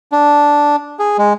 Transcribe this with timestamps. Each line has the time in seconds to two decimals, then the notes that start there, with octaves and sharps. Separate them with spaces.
0.12 D4
0.99 G#4
1.18 G#3